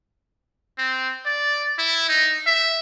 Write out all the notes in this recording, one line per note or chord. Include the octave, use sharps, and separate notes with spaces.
C4
D5
E4
D#4
E5